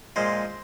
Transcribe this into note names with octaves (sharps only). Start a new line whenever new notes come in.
A#2 F3 G#3 C5